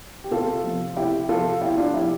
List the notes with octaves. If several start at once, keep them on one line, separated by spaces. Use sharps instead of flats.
G4
C3 F4 A4
F3
C3 E4 G4
F3 F4 A4
C3 E4 G4
D4 F4
F3 E4 G4